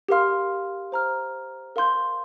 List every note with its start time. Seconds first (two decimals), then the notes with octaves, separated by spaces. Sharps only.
0.08 G4 A#4 F5 C6 F6
0.92 C5 A#5 F6
1.76 A#4 F5 C6 G6